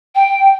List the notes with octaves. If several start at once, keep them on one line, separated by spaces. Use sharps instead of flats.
G5